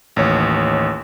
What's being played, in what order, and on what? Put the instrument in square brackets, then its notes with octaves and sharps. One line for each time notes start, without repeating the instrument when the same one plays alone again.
[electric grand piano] A1 D#2 C#5